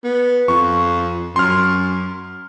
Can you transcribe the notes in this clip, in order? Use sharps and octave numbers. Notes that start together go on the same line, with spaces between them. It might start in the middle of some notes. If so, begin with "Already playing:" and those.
B3
F2 C#6
F#2 C6 F6